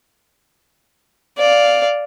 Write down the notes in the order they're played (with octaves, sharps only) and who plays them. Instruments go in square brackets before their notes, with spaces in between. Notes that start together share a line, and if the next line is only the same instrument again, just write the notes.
[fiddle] D5 F5